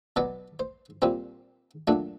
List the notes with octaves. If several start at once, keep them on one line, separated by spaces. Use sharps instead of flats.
B2 F#3 B3 D5
C5
A#2 G3 C4 C5
A#2 F#3 A3 D4